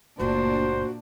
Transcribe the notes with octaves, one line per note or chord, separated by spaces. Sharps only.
F#1 A#2 A3 D4 F#4 C5